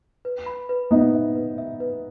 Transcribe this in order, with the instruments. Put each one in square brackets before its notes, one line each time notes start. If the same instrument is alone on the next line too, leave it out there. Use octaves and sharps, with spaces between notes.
[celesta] B4
B5
B4
[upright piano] B3 D#4 [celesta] E5
[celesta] E5
B4
E5
B4